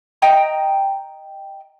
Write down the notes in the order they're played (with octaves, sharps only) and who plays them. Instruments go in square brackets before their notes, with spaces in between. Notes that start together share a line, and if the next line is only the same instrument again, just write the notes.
[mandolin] D#5 G5 A#5